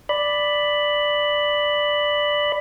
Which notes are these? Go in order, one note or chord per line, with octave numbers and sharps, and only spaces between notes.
D5 B5